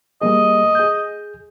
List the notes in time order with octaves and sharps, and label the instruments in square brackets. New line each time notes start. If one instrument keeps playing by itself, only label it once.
[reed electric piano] G3 A#3 G#4 [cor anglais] D#5
[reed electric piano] G#4 G6